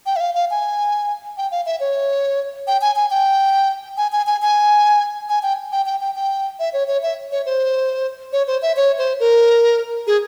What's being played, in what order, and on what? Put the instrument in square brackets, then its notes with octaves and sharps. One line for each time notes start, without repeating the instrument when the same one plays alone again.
[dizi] G5
E5
F5
F5
G#5
G5
F5
E5
C#5
G5
G#5
G#5
G5
G#5
G#5
G#5
G#5
G#5
G5
G5
G5
G5
G5
E5
C#5
C#5
E5
C#5
C5
C#5
C5
E5
C#5
C5
A#4
G#4